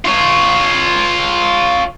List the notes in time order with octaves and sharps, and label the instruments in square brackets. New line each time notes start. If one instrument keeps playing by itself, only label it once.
[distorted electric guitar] F4 C#5